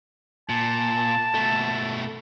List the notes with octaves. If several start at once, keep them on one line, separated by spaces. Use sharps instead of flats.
A#2 A5
B2 A3